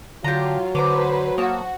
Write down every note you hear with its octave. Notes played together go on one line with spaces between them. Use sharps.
D3 F#3 F4 G4 A#5
D3 B4 C5 A#5 C#6 D6
A#3 F#4 A5 D#6